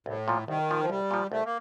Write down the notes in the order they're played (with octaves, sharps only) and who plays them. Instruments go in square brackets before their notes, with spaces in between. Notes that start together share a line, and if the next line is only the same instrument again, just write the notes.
[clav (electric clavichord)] C2 [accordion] A2
[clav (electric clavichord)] A#2 F3
[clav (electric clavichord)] C2 [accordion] D#3
[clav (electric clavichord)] A#2 F3
[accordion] F3
[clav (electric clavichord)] C2 [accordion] G3
[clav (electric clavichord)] A#2 F3
[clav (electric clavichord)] C2 [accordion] A3
[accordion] A#3